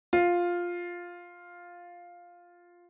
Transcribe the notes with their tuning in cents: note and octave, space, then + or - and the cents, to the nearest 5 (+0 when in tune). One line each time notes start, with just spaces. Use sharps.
F4 +5